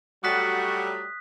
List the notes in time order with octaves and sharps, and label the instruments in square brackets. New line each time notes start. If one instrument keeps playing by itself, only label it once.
[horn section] F#3 G3 A3 [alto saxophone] F#4 [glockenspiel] D#6 F#6 B6